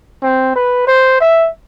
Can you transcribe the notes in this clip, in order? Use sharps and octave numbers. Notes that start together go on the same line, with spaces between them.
C4
B4
C5
E5